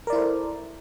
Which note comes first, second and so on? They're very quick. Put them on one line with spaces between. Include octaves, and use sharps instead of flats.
A#4 D5 E4 C5 A4